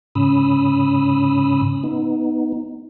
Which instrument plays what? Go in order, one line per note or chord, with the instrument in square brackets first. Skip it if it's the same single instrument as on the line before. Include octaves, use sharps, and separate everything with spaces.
[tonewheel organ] G#2 C#3 C#4 B5 D#6 E6
B3 D#4